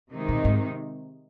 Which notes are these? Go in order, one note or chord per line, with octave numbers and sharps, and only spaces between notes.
C3 D#3 G#3 D#4
A#2
G#2